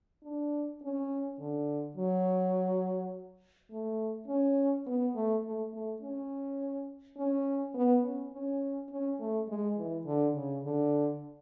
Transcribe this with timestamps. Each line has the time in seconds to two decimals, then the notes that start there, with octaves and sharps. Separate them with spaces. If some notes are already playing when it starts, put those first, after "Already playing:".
0.23 D4
0.82 C#4
1.39 D3
1.97 F#3
3.71 A3
4.28 C#4
4.86 B3
5.15 A3
5.44 A3
5.73 A3
6.02 C#4
7.17 C#4
7.75 B3
8.03 C#4
8.33 C#4
8.91 C#4
9.20 A3
9.49 G#3
9.77 E3
10.06 D3
10.34 C#3
10.64 D3